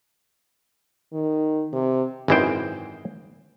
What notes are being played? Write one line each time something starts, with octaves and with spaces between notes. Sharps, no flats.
D#3
C3
G#1 F#2 E3 G#3 C5 G5